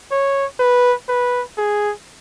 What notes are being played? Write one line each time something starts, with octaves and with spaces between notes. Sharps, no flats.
C#5
B4
B4
G#4